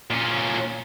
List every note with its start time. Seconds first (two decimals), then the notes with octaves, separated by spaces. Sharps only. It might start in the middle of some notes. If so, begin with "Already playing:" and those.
0.11 A#2 C#4